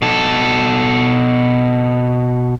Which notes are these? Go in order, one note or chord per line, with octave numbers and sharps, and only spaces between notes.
B2 A4